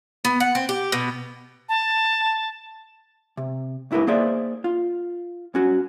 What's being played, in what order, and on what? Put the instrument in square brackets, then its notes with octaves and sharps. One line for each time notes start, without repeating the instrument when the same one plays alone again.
[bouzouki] B3
F#5
C4
G4
B2
[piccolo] A5
[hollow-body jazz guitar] C3
C2 G#2 E4 G4 A#4 B4
A#3 D#4 G#4 C5 D5 E5
F4
G2 C#4 F#4